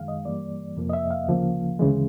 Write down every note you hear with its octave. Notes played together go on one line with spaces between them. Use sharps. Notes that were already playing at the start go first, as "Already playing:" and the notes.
Already playing: F#2 D#3 G#3 F5
D#5
G2 E3 G3 A#3 D5
F2 C3 F3 A#3
D#5
E5
F5
D2 C#3 F3 A#3
D2 C#3 E3 G#3